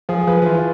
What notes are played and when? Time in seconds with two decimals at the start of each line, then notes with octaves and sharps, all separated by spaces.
0.09 F3 G#4
0.27 F3 B4
0.42 F3
0.45 E3 F4